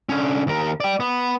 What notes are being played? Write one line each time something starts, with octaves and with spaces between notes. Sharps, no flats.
D3 C#4
D#2 A#4
D5 G5
B3